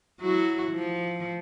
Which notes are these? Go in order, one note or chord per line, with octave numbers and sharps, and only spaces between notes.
F#3 E4 F#4
F3